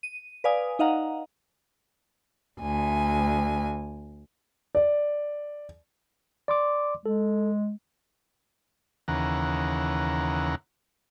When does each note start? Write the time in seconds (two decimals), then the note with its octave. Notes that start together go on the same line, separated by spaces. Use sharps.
0.03 D#7
0.44 B4 D5 F5 G#5 D#6
0.79 D#4 D#5 F5 F#5 A#5
2.60 D2 G#5
4.75 D5
6.48 D5 C6 D6
7.06 G#3 A4
9.08 D#2 C#3 E3 F#5 A#5